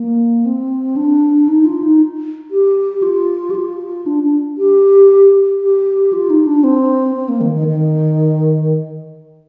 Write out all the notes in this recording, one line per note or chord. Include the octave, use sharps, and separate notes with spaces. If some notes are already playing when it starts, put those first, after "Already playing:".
Already playing: A#3
C4
D4
D#4
F4
D#4
G4
F4
G4
F4
D4
D4
G4
G4
F4
D#4
D4
C4
C4
A#3
D#3
D#3
D#3